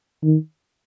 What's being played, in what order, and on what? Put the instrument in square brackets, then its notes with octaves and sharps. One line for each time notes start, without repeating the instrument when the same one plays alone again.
[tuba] D#3